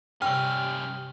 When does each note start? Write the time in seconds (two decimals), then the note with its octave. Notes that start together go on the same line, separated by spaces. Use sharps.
0.22 G2 C3 G3 C#4 G5 F6